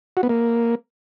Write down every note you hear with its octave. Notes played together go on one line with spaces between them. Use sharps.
F#4
B3
A#3